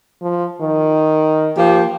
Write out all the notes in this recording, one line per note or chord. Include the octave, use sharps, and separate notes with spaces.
F3
D#3
F3 A#3 G4